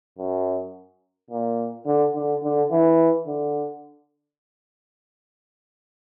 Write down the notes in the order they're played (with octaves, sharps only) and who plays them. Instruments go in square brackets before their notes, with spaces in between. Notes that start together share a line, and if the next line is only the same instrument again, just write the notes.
[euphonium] F#2
A#2
D3
D3
D3
E3
D3